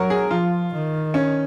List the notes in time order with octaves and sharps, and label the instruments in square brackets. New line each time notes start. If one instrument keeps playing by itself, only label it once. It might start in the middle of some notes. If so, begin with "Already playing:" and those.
Already playing: [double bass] F#3 [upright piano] A#4
[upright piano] G#4
[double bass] F3 [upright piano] F4
[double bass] D#3
[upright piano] C#4